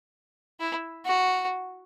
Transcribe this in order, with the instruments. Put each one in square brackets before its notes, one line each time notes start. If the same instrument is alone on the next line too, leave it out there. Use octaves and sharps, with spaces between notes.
[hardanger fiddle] E4
F#4